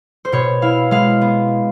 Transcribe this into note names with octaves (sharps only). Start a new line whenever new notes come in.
C5
B2 C#5
E4 F5
G#3 F5
B3